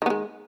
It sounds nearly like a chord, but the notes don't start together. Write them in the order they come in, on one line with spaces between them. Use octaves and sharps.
D#3 B3 G#3